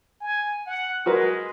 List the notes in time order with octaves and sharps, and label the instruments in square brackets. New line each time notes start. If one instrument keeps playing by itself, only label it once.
[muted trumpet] G#5
F#5
[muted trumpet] G#3 [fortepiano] F#4 A#4 B4